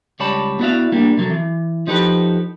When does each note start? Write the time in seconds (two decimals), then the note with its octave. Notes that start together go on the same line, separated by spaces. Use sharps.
0.20 C#2 G3 C#5 D5 A5 B5
0.59 B3 E4 F#4 D5 E5 F5
0.92 G3 A#3 D4
1.17 C3 F#3 A4
1.31 E3
1.87 F3 D#4 G4 A4 B4